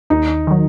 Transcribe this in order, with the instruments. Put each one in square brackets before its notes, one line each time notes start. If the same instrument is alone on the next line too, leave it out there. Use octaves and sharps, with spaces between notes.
[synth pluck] D#2 [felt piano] D#4
[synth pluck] D#3 F#3